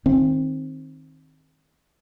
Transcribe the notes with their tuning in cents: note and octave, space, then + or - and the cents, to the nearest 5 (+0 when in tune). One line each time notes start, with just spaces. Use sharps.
D#3 +0 C4 +20